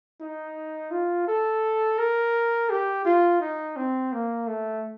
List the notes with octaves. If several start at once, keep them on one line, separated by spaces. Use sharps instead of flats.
D#4
F4
A4
A#4
G4
F4
D#4
C4
A#3
A3